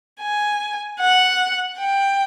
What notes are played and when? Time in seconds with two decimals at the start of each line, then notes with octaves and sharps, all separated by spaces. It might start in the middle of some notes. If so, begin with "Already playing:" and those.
0.21 G#5
1.00 F#5
1.79 G5